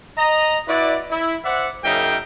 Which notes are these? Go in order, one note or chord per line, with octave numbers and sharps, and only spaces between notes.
D#5 A#5
E4 F#4 B4 D5
E4
C5 D5 E5 F#5
F#2 C#3 A#3 D#4 E5 G5